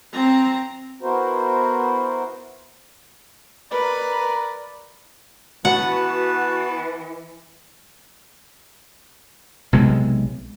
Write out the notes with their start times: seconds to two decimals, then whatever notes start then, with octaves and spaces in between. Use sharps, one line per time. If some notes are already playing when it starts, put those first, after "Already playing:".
0.13 C4 A#5
1.02 B3 E4 F#4 A#4 C5
3.71 A#4 B4 D5 A#5
5.65 E3 B3 F#4 B4 F#5 A5
9.73 B1 C3 G#3